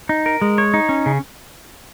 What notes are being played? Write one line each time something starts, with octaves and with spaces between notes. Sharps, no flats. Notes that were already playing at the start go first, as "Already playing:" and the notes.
D#4
A#4
G#3
C#5
D#4
C#4
C#3